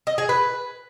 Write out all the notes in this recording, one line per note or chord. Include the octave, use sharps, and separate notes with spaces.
D#5
G#4
B4